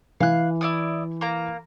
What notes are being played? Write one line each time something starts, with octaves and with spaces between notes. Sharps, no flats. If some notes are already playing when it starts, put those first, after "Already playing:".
E3 F5 G#5 F#6
E4 D5 D#6
A#3 A#5